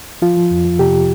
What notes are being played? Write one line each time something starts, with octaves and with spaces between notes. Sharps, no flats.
F3 F4
F3
F2
F3
C3 G4